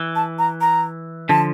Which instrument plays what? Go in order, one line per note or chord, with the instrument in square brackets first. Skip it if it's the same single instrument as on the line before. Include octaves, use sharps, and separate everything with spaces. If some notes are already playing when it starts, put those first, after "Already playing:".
Already playing: [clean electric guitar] E3
[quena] A5
A#5
A#5
[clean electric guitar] D3 F3 [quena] A5